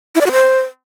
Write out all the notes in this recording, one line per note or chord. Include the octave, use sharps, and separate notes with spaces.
E4
D5
F#4
C5